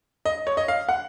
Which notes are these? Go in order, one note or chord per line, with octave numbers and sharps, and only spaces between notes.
D#5
C#5
D#5
F5
F#5